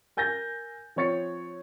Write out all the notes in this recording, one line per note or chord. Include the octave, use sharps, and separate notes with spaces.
A#4 G#5 G6 A6 A#6
F3 C4 C#5 A6 C#7